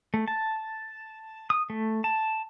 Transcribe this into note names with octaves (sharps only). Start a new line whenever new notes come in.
A3
A5
D#6
A3
A5